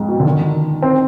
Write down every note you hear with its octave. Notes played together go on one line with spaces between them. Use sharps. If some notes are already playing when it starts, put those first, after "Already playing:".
Already playing: F2 G#2
B2
D3
D#3
C4